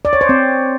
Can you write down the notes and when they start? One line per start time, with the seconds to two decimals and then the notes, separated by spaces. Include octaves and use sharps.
0.05 D5
0.13 C#5
0.21 C5
0.29 C4